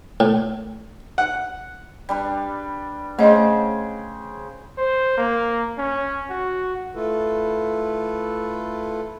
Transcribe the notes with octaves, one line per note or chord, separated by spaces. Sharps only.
A2
F#5
G3 D4 B4
C#3 A3 C5 D#5
C5
A#3
C#4
F#4
A3 E4 F4 A4 B4